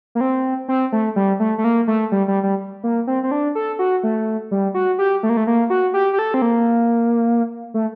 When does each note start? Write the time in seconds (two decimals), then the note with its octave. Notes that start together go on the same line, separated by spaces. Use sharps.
0.15 A#3
0.21 C4
0.68 C4
0.92 A3
1.16 G3
1.40 A3
1.58 A3
1.64 A#3
1.88 A3
2.12 G3
2.28 G3
2.43 G3
2.84 A#3
3.07 C4
3.23 C4
3.31 D4
3.55 A4
3.79 F#4
4.03 A3
4.51 G3
4.74 F#4
4.99 G4
5.23 A3
5.29 A#3
5.37 A3
5.47 A#3
5.70 F#4
5.94 G4
6.13 G4
6.19 A4
6.34 C4
6.42 A#3
7.74 A3